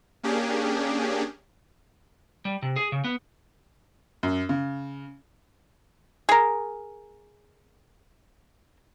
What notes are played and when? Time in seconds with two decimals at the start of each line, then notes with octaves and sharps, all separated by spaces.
0.23 A#3 C#4 D4 G4 G#4
2.45 G3
2.62 C3
2.76 G#4
2.92 C#3
3.04 B3
4.23 F#2
4.49 C#3
6.29 G#4 A#4